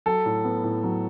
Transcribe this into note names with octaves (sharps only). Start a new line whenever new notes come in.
F#3 A4
A2
B3
A2
F#3